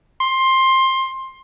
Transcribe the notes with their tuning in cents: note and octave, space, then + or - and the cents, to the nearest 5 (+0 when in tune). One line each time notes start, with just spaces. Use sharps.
C6 +15